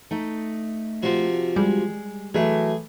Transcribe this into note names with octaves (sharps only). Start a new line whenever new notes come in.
A3 D#4 E5
C3 F3 F#4
G3 G#3
E3 F#3 A3 G#4 A#4